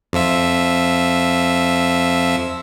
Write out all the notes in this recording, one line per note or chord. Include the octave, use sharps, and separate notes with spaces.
F2 F3 E5